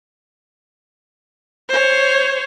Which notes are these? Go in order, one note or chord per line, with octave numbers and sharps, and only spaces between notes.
C5 C#5